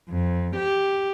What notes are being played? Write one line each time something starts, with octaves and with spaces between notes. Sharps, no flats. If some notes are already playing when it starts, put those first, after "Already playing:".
F2
G4